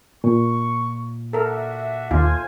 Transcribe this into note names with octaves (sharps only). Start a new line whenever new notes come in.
A#2 C#6
D4 F#4 A4 A#4 E5
D#2 A3 F4 C5 G#5